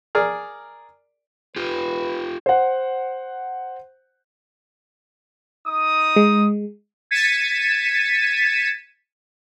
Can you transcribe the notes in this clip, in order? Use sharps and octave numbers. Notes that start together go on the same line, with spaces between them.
G#4 A#4 D5 F6
F4 G4 B4
C5 F#5
D#4 D#6
G#3
G#6 A6 B6 C#7 D#7 E7